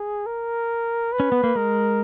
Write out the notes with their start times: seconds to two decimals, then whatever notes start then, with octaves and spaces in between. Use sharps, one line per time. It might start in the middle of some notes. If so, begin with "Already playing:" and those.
Already playing: G#4
0.26 A#4
1.12 B4
1.20 C#4
1.32 B3
1.44 A#3
1.55 G#3 A#4